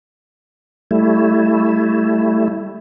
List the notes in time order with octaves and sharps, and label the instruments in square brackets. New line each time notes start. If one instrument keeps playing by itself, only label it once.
[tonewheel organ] G3 A3 E4